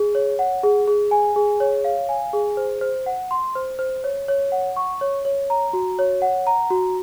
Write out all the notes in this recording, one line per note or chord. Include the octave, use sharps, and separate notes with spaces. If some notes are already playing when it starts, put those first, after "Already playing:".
Already playing: G#4
C#5
F#5
G#4
G#4
G#5
G#4
C#5
F5
G#5
G#4
C5
C5
F#5
C6
C5
C5
C#5
C#5
F#5
C#6
C#5
C#5
A#5
F#4
C#5
F#5
A#5
F#4